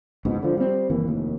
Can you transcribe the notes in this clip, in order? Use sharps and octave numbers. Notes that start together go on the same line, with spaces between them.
F#1 C#2 G#2 B2
D3 F3
G3 C4
F#1 D#2 E3 A#3
F1 D#2